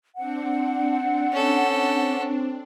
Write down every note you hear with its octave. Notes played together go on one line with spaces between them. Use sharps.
C4 D4 F#5
C#4 A4